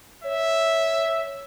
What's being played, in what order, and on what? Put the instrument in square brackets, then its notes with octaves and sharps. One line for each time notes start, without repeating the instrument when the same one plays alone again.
[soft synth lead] C#5 [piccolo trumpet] E5